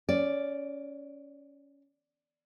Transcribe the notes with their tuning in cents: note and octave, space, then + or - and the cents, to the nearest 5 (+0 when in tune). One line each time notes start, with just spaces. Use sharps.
C#4 +15 D5 +0